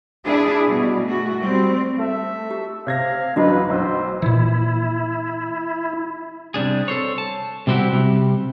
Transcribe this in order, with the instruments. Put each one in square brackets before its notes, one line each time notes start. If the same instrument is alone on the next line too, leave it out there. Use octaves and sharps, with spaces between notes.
[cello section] D4 E4 G#4
B2 G3
A3 F#4
G3 C4
[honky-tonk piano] A3 [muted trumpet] E5
[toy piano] G4
[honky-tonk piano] C3 G#6 A#6 [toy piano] C#5 [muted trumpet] F5
[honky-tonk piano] A1 F#2 [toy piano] D4 F#4 D#5 [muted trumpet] B4
[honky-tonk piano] B1 E6 [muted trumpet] C5
[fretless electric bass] A#2 E3 [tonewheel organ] E4
[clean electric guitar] C3 G3 D4 G#4
A4 C5 C#5
A5
C3 G3 C4 E4 F#4 G4
C3 G3